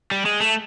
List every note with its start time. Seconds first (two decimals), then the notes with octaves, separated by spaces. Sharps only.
0.11 G3
0.26 G#3
0.40 A3